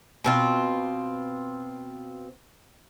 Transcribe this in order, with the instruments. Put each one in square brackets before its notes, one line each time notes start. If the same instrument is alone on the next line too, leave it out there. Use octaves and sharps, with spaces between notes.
[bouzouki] B2 C4 F4